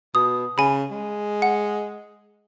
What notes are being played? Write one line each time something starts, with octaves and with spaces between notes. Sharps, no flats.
B2 D#6
C#3 G#5 B5
G#3
F#5